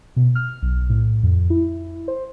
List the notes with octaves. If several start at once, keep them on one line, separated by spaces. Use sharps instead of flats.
B2
F6
B1
A2
F2
E4
C5